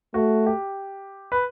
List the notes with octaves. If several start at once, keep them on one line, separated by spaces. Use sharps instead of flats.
A3 F#4
G4
B4